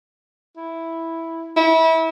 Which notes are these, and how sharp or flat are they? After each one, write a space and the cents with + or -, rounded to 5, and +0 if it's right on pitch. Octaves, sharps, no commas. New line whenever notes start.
E4 -5
E4 -30